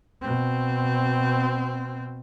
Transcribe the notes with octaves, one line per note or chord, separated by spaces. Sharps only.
B2 C4